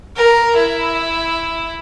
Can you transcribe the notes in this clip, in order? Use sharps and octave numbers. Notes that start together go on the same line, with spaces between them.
A#4
E4